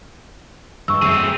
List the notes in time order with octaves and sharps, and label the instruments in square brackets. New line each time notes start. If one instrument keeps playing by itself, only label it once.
[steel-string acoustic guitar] G2 G#3 [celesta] C#6 E6
[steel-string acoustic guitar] F#2 A3 [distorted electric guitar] C4 G#4 [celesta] E6